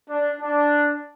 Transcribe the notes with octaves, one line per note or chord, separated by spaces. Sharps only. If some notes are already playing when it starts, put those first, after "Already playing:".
D4
D4